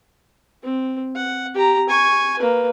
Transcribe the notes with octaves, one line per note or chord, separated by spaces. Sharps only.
C4
F#5
G4 A#5
G#5 C#6
A#3 B4